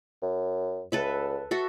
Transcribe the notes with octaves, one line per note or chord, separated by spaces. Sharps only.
F#2
C#2 A4 B4 E5
F#4 A4 E5